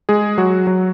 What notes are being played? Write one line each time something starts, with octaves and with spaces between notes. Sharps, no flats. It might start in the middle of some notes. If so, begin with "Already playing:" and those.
G#3 G#4
F#3 F#4
F#3 F#4